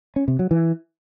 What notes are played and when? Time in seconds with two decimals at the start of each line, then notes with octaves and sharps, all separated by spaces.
0.16 C#4
0.28 C3
0.39 F#3
0.51 E3